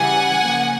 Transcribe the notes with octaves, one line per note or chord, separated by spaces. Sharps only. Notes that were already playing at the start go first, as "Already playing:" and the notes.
Already playing: C#3 E3 G3 F#5 G#5
C#3 F3 A#3